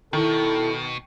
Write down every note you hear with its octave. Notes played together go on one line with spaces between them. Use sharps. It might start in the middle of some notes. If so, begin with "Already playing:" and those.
B2 D#3 E4 A4